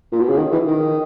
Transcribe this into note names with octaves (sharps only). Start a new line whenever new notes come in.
A#2
B2
C#3
D#3
E3
D#3